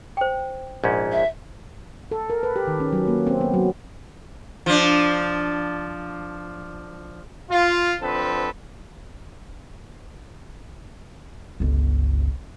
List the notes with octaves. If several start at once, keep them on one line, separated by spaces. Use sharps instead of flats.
C5 G5
A#1 G#2 C#4
E5
A4
A#4
B4
G4
D#3
C#4
F#3
A#3
C4
B3
F#3
F3 D4
F4
F3 C4 D4 A4 B4
G1 C#2